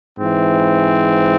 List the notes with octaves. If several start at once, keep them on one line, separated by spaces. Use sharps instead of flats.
G#2 E3 C4